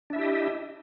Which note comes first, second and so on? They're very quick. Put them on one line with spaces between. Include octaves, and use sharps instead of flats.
D4 E5 E4 G4 D#5